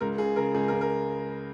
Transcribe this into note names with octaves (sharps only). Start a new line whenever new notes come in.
C#2 A#4
C#3 G#4
C#3 A#4
C#2 G#4
A#4
C#2
A#4